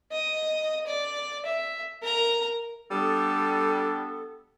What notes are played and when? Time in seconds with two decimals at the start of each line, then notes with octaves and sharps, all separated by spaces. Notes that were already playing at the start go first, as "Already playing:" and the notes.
0.12 D#5
0.87 D5
1.45 E5
2.03 A#4 A#5
2.90 G3 B3 D4 A4